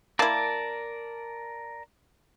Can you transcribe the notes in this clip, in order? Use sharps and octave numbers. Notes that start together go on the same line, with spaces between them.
A#3 E4 A#4 D5 A5